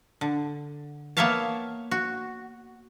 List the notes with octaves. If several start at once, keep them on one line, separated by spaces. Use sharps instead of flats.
D3
A#3 B3 C#5 E5 F5 A5
F#4